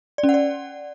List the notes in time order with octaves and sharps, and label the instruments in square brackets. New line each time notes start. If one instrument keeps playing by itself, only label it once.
[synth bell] D5
C#4
F#5
D5